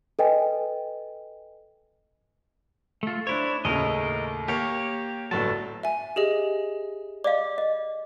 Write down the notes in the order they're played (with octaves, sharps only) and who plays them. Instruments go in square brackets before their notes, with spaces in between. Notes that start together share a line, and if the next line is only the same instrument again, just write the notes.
[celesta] A4 B4 D#5 G5 G#5
[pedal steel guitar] A3 F4
[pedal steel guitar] D4 E4 C#5 [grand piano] C5
[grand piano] D#2 A2 C#3 [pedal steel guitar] A#4 D#5
[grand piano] A#3 [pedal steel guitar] G4 C#5
[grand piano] G1 A2 F#3 [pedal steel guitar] A5
[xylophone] E5 G#5
G4 G#4 D#5
[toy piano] D5 D#5 F5 [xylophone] D6
[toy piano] D#5